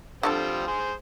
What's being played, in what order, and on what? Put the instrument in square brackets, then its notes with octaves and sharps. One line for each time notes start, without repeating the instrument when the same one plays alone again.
[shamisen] D3 C#4 A4 [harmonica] F3 G3 C4
[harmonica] G#4 C5